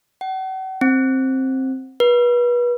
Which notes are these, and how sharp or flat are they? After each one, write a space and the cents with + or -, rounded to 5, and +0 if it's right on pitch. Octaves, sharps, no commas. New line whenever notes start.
F#5 +40
C4 +10
B4 -30